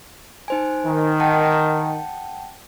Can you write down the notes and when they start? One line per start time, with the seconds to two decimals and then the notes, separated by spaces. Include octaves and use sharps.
0.48 D#4 C5 G#5
0.85 D#3
1.20 F#5 G5 A5